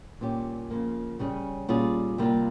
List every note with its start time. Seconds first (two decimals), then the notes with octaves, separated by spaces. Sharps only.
0.21 A#2 G3 C#4 G4
0.70 C#3 F3 A#3
1.19 C#3 G3 C#4 G#4
1.69 A#2 G3 C#4 F4 G#4
2.18 C3 G3 A#3 F4